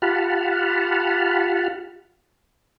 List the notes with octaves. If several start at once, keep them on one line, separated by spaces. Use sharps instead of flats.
F4 G4 F#5 A5 B5 F6